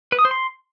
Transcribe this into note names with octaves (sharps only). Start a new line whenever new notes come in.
B4
D#6
C5
C6